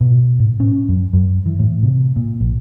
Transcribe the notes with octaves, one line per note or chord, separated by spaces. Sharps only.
B2
A2
C#4
F#2
F#2
E3
A2
C3
A#2
A#1